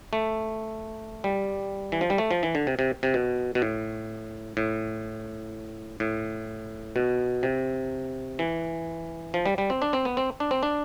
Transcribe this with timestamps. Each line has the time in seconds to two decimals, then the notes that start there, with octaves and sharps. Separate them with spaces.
0.13 A3
1.24 G3
1.92 E3
2.01 F3
2.10 G3
2.18 A3
2.31 F3
2.43 E3
2.55 D3
2.67 C3
2.79 C3
3.03 C3
3.14 B2
3.55 B2
3.62 A2
4.57 A2
6.00 A2
6.96 B2
7.43 C3
8.39 E3
9.34 F3
9.46 G3
9.58 G3
9.70 C4
9.82 D4
9.93 C4
10.05 B3
10.17 C4
10.40 D4
10.51 C4
10.63 D4